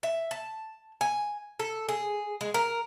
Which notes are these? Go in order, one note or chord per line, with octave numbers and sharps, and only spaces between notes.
E5
A5
G#5
A4
G#4
G#3
A#4